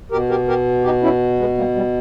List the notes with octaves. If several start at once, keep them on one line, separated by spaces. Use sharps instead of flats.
B2 G4 A#4
G4 A#4
G4 A#4
D#4 G4
C#4 E4
G#3 B3
G3 A#3
G3